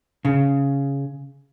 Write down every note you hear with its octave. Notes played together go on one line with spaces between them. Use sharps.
C#3